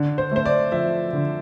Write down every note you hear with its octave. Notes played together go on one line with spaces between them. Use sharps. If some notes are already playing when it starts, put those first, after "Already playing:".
Already playing: D3
C5
A3 C5
D5
F3 E5
D3